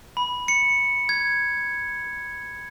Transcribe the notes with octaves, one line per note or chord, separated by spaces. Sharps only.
B5
C#7
G#6